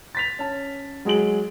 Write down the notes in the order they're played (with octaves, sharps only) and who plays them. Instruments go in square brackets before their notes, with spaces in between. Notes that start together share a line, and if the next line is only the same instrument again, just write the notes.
[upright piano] A6 B6 F7
C#4 A5
F#3 G#3 G#4 D7 F#7